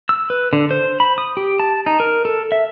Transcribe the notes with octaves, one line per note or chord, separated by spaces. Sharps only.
E6
B4
D3
C5
B5
D#6
G4
A5
D#4
A#4
A4
E5